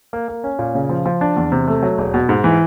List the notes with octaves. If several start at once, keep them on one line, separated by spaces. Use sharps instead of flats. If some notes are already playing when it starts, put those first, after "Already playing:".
A#3
A#3
C#4
A#2
C#3
F3
F3
D4
E2
C3
A3
F#3
E1
B2
G#2
E3